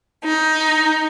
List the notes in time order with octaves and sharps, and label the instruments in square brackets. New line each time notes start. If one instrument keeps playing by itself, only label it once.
[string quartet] D#4